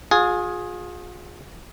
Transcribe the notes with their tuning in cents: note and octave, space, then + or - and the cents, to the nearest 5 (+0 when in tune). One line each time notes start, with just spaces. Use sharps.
F4 +40 G#4 +0